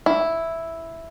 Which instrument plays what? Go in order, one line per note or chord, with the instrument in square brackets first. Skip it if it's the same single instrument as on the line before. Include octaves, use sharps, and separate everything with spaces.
[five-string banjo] E4